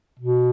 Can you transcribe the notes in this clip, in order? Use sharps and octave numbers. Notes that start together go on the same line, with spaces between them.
B2